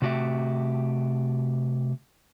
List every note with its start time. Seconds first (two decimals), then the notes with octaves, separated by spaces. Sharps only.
0.02 C3 A3 F#4 G4 E5